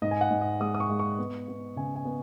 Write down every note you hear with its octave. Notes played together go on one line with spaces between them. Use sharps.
G#2 D#5
G#5
F#5
G#2
D#5
G#3 D#6
D#6
C#6
G#3
C#6
B3
B3
C#3 G#5
G#5
B3